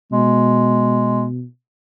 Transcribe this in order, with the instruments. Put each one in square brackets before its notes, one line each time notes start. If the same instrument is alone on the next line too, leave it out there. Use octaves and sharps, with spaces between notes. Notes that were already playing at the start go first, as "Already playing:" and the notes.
[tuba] B2 [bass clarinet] G#3